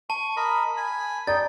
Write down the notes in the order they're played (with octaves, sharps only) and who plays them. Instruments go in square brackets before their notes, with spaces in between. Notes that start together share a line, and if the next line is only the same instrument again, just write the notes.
[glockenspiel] A5 [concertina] C#6
[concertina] A#4 D#5 B5
G#5 B5
[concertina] D#4 G5 [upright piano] D5 [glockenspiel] A6